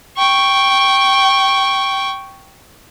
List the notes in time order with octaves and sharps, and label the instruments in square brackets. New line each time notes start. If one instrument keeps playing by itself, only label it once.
[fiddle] G5 C#6